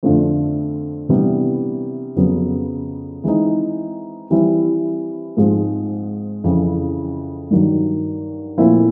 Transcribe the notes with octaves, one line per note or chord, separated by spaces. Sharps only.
F2 D3 F3 A3 C4
C3 E3 G3 B3 D4
F2 C#3 F#3 B3
E3 G#3 C4 D#4
E3 G3 C4 E4
G#2 F3 G#3 C4
F2 C#3 E3
G2 D#3 F#3
A#2 F3 A3 C4 E4